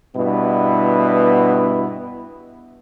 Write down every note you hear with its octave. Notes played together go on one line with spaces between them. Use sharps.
G2 B2 B3 E4